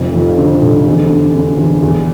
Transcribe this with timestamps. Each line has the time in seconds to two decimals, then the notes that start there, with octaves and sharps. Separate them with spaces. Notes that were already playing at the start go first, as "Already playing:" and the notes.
Already playing: F1 F2
0.14 F3
0.38 D3
0.61 F1
0.86 E2
1.10 D3
1.34 D3
1.58 E2
1.82 E2